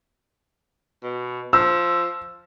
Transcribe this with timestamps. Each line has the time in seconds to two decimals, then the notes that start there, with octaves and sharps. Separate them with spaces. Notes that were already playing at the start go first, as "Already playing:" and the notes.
1.03 B2
1.53 F3 E6